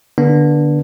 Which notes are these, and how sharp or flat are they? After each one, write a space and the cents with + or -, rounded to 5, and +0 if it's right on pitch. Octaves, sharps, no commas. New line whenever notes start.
D3 +15 B3 -30 D4 +0